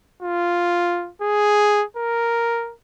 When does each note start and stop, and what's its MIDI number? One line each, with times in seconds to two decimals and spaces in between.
0.22 1.09 65
1.21 1.84 68
1.97 2.73 70